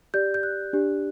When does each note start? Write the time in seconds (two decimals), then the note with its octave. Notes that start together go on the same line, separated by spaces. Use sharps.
0.14 G4 D5 G6
0.34 G6
0.43 F#6
0.73 D4 G4 D5